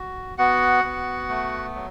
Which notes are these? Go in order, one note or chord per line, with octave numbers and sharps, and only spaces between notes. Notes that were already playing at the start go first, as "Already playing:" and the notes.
Already playing: F#4
B3 F#4 F#5
B3
A3
F#3